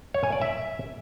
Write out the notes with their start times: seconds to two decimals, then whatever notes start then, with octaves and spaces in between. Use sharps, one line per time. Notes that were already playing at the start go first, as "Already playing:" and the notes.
0.14 C#5
0.23 G#5
0.32 D5
0.41 E5